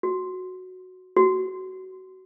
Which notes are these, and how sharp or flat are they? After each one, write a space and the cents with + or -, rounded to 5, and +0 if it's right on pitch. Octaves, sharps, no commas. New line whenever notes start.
F#4 -5
F#4 +20